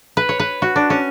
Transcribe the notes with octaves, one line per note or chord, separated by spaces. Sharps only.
B4
C#5
B4
F#4
D4
C#4